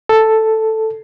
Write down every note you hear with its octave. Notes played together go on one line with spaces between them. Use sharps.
A4